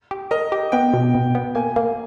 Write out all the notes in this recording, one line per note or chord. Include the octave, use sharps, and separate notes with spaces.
G4
A#4 D#5
G4
B3 G5
B2
B2
B3
A#3 G#5
A#3